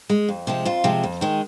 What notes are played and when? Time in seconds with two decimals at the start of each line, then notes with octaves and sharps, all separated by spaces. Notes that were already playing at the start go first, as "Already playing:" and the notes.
0.10 G#3
0.29 F2
0.47 C3 F3 G#3
0.65 F2 F4
0.84 C3 F3 G#3
1.04 F2
1.21 D#3 G#3